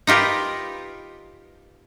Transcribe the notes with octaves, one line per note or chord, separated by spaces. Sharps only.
D#4 F4 G4 A#4 B4